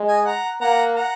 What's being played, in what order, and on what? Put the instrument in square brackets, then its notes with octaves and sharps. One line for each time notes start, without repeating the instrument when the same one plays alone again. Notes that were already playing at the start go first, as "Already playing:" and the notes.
Already playing: [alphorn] G#3
[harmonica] D#5 G#5
F#5 A#5
[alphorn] A#3 [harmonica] F#5 A#5
[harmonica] F#5 A#5